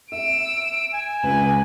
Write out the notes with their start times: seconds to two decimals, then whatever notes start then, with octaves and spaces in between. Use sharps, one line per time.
0.12 E5 E6 D7
0.94 G#5
1.23 C#2 B4